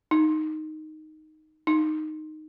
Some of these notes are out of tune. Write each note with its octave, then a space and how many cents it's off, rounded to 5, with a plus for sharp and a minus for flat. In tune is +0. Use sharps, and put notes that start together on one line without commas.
D#4 +0
D#4 -5